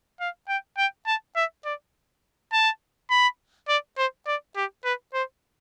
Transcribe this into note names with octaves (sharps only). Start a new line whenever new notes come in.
F5
G5
G5
A5
E5
D5
A5
B5
D5
C5
D5
G4
B4
C5